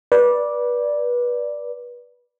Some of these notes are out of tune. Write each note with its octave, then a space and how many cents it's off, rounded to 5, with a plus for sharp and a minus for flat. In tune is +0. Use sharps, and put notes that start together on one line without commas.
B4 -25 D5 +0